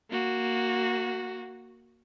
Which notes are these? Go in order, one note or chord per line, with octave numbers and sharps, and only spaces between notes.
A#3 F#4